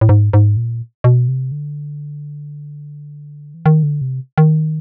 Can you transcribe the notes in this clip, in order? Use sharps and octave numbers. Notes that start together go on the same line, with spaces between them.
A2
G#2
G#2
A#2
B2
C3
D3
E3
D#3
D3
C3
D#3